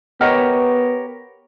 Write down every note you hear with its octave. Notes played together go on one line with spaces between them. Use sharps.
B3 G4 A#4 C#5 D#5 F#5 F6